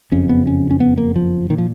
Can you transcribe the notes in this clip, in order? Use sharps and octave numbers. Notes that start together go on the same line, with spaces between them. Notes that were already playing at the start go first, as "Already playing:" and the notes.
F#1 F2 C#3 C#4
B3
C#4
C#4
B3
A#3
F3
A#2 D#3
F3